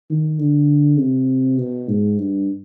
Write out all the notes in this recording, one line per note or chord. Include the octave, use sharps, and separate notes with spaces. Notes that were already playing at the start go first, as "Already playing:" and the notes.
D#3
D3
C3
B2
G#2
G2